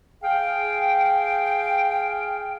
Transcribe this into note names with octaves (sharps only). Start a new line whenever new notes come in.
G#4 F5 G5